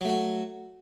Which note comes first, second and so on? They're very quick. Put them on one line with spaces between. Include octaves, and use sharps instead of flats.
F#3 A3 F#4